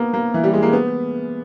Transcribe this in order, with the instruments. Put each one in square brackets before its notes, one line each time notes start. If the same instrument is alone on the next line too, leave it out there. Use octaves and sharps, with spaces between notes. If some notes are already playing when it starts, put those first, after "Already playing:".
Already playing: [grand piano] A#3 B3
A#3
E3
G3
G#3
A#3
B3